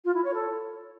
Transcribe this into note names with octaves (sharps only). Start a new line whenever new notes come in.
F4
E4
C#5
A4